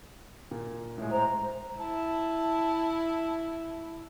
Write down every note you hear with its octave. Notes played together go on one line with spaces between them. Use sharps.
A#2
A2 G#3
C5 A#5
E4 A5